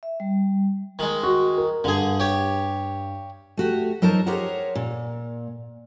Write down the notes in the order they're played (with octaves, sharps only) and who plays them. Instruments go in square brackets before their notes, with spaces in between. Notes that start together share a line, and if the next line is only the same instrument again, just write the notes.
[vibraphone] E5
G3
[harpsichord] D#3 G#3
[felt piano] F#4
A#4
[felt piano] G2 [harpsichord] D3 G#4
[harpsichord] G4 C#5
[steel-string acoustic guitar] A3 F#4 G4
F#3 D#4 A#4 C5 A5
G4 G#4 A#4 C5 C#5 F#5
A#2